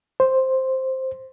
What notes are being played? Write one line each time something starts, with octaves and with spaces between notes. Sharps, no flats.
C5